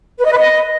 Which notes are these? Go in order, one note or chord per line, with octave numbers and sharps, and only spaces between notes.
B4
D#5
B4
D#5